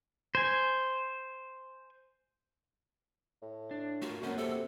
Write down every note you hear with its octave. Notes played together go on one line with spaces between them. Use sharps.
C5 G#5
A2
D4
A3 F4 F#4 A#4
F#2 A#3 C4 C#4 F#4
C3 A4